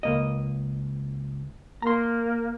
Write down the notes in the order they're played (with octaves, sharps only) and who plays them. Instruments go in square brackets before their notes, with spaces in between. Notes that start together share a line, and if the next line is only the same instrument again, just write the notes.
[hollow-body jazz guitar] C#2 A#3 D#5
[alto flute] A#3 [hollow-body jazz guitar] A#5 C6